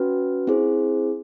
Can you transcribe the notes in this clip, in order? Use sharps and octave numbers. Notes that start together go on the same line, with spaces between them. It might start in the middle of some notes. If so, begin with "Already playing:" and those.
Already playing: C#4 F#4 B4
C4 E4 G#4 C5